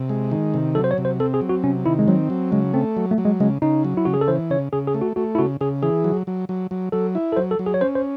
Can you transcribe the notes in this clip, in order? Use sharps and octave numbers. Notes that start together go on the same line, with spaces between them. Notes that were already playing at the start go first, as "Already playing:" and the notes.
Already playing: C3
G#3
D#3
C3
F#3 A4
C5
C#5
C3
C5
C4 A4
G#4
F#3
F#4
C3 C#4
D#3 E4
G#3
F#3 C4
F#3
C#3 G#3
A3 C4
F#3
A3
F#3
G#3
C#3 G#3
C#3 D#4
F#3
E4
C#3 F#4
G#4
A4
E3 C5
C#3 C#5
C#3 G#4
G#4
A3
F#4
A3 F#4
E4
C#3 F#4
C#3 G#4
E3 G#4
F#3
F#3
F#3
F#3
F#3 A4
E4
A4
F#3 C5
A4
F#3
G#4
C#5
C#4 C5
C5